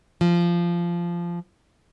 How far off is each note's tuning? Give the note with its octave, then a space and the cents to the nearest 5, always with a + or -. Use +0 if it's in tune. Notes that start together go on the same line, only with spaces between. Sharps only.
F3 -15